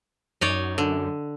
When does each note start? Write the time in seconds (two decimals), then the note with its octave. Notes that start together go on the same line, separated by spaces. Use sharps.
0.41 F#2 D#4 C#5 D5
0.78 D3